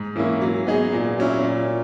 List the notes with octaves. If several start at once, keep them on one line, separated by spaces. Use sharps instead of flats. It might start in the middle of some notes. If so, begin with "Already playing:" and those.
Already playing: G#2
E3 A#3 C#4 E4
F#3
B3 D#4 G#4
A#2
F#3 C#4 E4
A#2